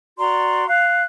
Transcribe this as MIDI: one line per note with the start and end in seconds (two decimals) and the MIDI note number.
0.17 0.65 66
0.17 0.65 74
0.17 0.65 82
0.17 0.65 84
0.66 1.02 77
0.66 1.02 90